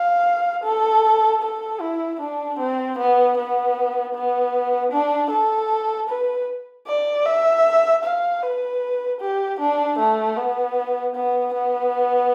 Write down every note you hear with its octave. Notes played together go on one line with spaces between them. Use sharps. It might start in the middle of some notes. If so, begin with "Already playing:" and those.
Already playing: F5
A4
A4
E4
D4
C4
B3
B3
B3
D4
A4
B4
D5
E5
F5
B4
G4
D4
A3
B3
B3
B3